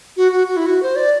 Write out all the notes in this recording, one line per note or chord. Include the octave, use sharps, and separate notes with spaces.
F#4
F#4
F#4
E4
F#4
C5
D5